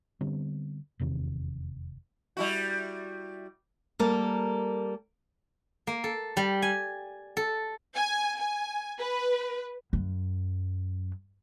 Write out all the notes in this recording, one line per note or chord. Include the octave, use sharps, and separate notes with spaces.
D3 G3 B3 C4
F1 E2 C3 D#3
G3 E4 F#4
G3 A#3 A4 A#4
A#3
A4
G3
G#5
A4
G#5
G#5
B4
F#2